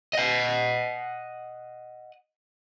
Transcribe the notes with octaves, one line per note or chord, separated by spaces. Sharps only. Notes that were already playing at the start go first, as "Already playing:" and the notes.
D#5 F#5